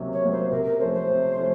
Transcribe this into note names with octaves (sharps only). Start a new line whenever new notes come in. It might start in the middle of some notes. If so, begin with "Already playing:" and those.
Already playing: C3 F#3 A#3 C#4
C#5
F#3 A#3 C#4
C5
C3 A#4
A#4
F3 A3 C#4 C5
C5
C3
F3 A3 C#4